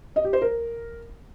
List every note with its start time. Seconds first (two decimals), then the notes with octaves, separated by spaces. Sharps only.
0.16 D#5
0.25 G4
0.33 C5
0.42 A#4